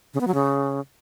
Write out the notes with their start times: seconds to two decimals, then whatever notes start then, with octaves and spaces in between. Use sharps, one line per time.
0.14 C#3
0.21 B3
0.27 F#3
0.34 C#3